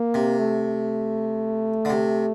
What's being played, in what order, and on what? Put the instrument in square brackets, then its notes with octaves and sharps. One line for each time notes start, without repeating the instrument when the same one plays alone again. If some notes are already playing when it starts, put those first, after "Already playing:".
Already playing: [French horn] A#3
[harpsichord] C3
[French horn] A3
[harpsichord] D3
C3